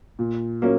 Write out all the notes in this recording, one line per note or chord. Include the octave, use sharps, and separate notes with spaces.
A#2
F#3 A#3 C#4